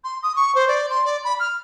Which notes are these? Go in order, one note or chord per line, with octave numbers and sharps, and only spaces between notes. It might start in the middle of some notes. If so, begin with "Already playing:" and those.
C6
D#6
C#6
C5
D5
C6
D5
B5
F6